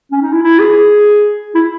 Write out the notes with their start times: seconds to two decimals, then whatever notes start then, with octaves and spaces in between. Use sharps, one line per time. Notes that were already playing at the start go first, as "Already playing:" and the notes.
0.12 C#4
0.22 D#4
0.33 E4
0.43 E4
0.59 G#4
1.55 E4